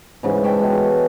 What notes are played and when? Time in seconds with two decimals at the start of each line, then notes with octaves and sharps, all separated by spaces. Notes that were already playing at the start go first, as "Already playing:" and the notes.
0.23 G#2 C#3 E3
0.44 C#5 E5 G5 A5
0.59 B2 G#3
0.72 G#4 A4